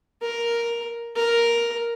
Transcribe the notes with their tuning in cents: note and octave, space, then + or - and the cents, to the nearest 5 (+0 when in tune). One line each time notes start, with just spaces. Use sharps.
A#4 +5
A#4 +5